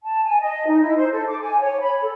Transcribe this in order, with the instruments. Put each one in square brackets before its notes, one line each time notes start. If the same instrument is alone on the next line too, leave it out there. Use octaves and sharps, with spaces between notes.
[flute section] A5
G#5
D#5
D#4
E4
C5
A4
D6
G#5
C#5
B5
A4